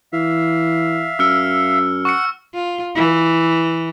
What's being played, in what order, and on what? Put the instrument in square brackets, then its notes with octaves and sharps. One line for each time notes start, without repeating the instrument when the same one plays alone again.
[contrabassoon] E3 [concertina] E5 F5
[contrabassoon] F#2 [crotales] E6 F6 C#7
[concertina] F#5 [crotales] C#6 C#7
[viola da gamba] F4
E3